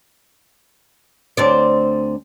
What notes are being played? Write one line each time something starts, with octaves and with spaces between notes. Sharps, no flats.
D2 C4 D5